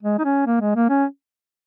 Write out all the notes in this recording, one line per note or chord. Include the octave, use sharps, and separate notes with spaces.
G#3
D#4
C#4
A#3
G#3
A#3
C#4